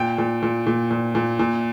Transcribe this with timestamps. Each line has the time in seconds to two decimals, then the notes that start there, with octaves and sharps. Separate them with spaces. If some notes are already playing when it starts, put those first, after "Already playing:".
Already playing: A#2 G5
0.18 A#2
0.42 A#2
0.66 A#2
0.91 A#2
1.15 A#2
1.39 A#2